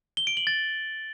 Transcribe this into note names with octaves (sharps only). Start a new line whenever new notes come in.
G7
D7
F#7
A6